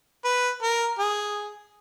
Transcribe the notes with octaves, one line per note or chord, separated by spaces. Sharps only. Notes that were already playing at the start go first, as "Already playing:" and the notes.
B4
A#4
G#4